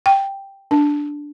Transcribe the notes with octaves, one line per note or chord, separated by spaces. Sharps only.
G5
D4